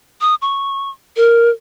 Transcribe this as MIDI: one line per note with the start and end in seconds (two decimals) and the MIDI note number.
0.21 0.35 87
0.42 0.90 85
1.17 1.50 70